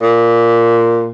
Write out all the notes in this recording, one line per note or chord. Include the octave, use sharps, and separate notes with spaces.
A#2